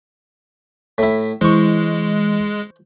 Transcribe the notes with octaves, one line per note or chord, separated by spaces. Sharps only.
A2 E4
E3 G#3 C5 C#6